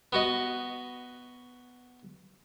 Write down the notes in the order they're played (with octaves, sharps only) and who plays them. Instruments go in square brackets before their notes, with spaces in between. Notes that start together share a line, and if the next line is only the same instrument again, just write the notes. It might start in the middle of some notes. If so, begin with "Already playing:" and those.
[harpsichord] B3 F#4 D#5